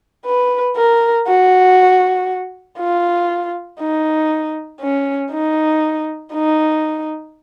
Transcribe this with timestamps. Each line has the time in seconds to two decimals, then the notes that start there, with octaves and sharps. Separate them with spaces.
0.26 B4
0.77 A#4
1.27 F#4
2.79 F4
3.80 D#4
4.80 C#4
5.31 D#4
6.33 D#4